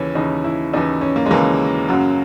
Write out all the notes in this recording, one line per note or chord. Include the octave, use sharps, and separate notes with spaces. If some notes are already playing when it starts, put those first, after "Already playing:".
Already playing: D#2 C#3 E3 C#4
D#2 C#3 E3 D#4
E4
D#2 C#3 E3 D#4
C#4
A#3
G#3
D#2 C#3 E3 A#3
F#2 C#3 F#3